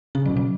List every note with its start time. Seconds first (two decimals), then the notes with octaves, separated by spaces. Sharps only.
0.15 C#3 C#4
0.26 F#3
0.29 B2
0.37 F#3